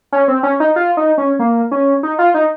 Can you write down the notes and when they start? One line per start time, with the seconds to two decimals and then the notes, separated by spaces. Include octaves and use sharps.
0.12 C#4
0.28 C4
0.43 C#4
0.60 D#4
0.76 F4
0.97 D#4
1.18 C#4
1.39 A#3
1.71 C#4
2.03 D#4
2.19 F4
2.34 D#4